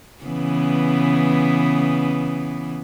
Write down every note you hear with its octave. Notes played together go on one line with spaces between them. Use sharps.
C#3 E3 B3